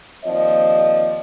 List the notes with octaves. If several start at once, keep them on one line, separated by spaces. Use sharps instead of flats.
D#2 F3 C4 D5 D#5